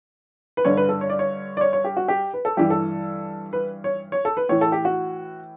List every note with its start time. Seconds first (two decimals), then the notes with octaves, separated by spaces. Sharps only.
0.57 B4
0.65 G2 D3 C#5
0.77 B4
0.89 A4
1.01 C#5
1.10 D5
1.19 C#5
1.57 D5
1.61 C#5
1.73 C#5
1.84 G4
1.97 F#4
2.08 G4
2.34 B4
2.45 A4
2.57 G2 E3 G4
2.70 A4
3.53 B4
3.84 C#5
4.12 C#5
4.25 A4
4.37 B4
4.49 A2 E3 C#5
4.61 A4
4.72 G4
4.85 F#4